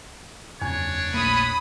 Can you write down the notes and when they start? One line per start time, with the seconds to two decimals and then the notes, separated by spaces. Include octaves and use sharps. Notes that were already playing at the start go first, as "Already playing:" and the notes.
0.62 F#1 E2 C3 D4 C#5
1.14 A#1 A3 A#3 B5 D#6